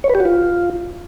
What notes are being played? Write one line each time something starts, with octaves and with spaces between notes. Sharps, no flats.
C#5
B4
G4
F#4
F4